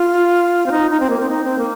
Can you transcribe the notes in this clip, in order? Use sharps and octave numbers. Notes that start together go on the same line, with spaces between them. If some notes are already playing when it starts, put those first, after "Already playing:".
Already playing: F4
C4
D#4
D#4
C4
A#3
C4
D#4
C4
A#3